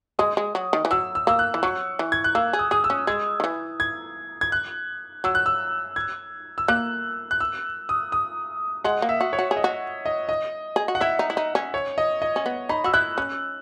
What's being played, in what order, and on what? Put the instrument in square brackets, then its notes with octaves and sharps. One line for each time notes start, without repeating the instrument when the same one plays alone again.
[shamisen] G#3 [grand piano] D#6
[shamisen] G#3
F#3
D#3
E3
[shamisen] F#3 [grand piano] E6
[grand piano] E6
[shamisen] A#3 [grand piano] E6
[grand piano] F#6
[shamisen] E3
[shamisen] F#3 [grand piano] C#6
[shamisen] E3
[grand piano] G#6
F#6
[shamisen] A#3 [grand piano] E6
[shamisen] G#4
[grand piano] D#6
[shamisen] G#4 [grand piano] D#6
[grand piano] E6
[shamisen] C#4
[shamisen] G#3 [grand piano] G#6
[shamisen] D#3
E3
[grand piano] G#6
G#6
F#6
[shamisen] F#3 [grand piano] E6
[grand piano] F#6
E6
G#6
E6
[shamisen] A#3 [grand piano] F#6
[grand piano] F#6
E6
D#6
D#6
[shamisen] G#3 [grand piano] F#5
[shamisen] A#3
[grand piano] E5
[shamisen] F#4
[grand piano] C#5
[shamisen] F#4
G#4
[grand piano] D#5
[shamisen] F#4
[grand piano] D#5
D#5
[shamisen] G#4
F#4
[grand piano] F#5
[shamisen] E4 [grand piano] E5
[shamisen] D#4
E4
D#4
C#4
[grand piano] C#5
D#5
D#5
[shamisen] C#4
B3
[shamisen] D#4 [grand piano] B5
[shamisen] F#4 [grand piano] E6
[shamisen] E4 [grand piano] F#6
[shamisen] C#4 [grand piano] F#6